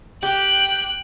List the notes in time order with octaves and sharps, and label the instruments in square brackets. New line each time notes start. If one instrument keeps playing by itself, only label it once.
[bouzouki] G4 [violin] G5 F#6